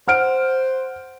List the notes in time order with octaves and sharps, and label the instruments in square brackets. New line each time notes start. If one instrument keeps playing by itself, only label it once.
[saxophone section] C5 [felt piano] F#5 F6 D7